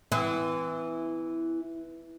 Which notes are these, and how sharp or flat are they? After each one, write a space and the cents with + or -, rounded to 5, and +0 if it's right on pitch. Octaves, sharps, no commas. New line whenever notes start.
E3 +0 C4 -45